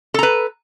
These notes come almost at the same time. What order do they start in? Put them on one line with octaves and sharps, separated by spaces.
A4 A#5 B4